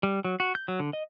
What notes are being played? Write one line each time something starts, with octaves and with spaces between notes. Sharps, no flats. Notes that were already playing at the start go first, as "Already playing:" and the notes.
G3
F#3
F#4
G6
F#3
D3
D#5